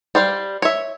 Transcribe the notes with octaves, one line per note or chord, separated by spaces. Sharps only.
G3 C5 F5
C#5 E5